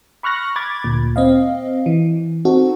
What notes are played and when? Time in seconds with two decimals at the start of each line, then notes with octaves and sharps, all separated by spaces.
0.23 B5 C#6 F6 F#6 A#6
0.56 B5 D6 G#6 A6
0.84 D2 A#2
1.16 C4 D#5 F5
1.86 E3
2.45 C4 D#4 F#4 A4